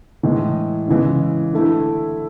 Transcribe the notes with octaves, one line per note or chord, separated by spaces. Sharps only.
A2 E3 G#3
C#3 E3 G#3
D3 A3 E4